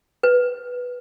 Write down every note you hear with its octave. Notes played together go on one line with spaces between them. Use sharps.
B4